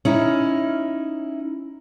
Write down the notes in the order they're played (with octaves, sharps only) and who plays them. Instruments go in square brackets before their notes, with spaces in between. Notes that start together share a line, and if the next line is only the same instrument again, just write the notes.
[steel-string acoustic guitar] C#4 D#4 E4